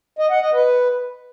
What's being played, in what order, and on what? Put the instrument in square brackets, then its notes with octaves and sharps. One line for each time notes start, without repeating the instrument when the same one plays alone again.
[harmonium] D#5
F#5
D#5
B4